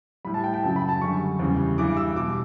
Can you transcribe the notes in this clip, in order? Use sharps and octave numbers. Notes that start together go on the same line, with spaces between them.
A2 G3 B5
A5
G5
G5
F#2 C#3 F#3 A5
B5
A5
F#2 D3 G3 C#6
E2 C#3 G3
G2 E3 G3 D6
E6
B2 G3 D6